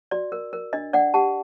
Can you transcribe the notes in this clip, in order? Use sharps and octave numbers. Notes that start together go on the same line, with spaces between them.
F#4 D5
A#4
A#4
D4 D#5
D4 D5 F#5
G4 F#5 A5